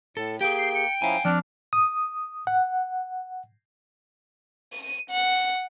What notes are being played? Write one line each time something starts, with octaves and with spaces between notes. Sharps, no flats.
A2 A4
A#3 G4 G#4 G5 D7
C7
C#7
F3 C#4 E4 F5 G#5 A#5
F3 C4 D4 D5 F6 F#6
D#6
F#5
D#7
F#5